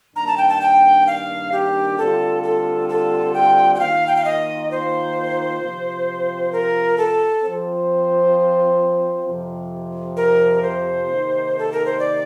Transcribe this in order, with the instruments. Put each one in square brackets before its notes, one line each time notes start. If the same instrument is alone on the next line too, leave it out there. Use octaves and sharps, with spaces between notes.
[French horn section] G2 D#3 A#3 D4 [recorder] A#5
[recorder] A5
G5
A5
G5
F5
G4
[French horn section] D2 D3 G3 C4 F4 [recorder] A4
[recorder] A4
A4
G5
G5
[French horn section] D#3 A#3 F4 [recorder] F5
[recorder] G5
F5
D#5
C5
[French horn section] C3 F3 C4 F4
[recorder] A#4
A4
[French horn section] F3 C4 F4 C5
F2 C3 F3
[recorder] A#4
C5
[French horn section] C3 D#3 A#3 D#4
[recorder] A4
A#4
C5
D5